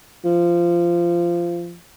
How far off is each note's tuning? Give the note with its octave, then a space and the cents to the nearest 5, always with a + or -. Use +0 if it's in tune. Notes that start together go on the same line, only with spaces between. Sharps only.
F3 -20